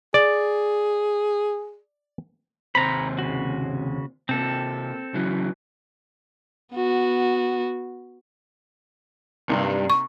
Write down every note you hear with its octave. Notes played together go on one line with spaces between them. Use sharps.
G#4 D5
D#2 C3 C5 A#5 B5
C#3 F#4
C3 A#3 C4 A4
C#3 E3 F#3
B3 F#4
C2 G2 C3 A#3 D#4
C#6